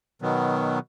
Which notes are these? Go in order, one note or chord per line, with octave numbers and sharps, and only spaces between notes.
B2 D#3 F#3 B3